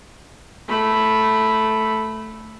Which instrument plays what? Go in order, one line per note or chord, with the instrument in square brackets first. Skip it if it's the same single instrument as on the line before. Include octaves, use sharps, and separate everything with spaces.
[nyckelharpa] A3 B5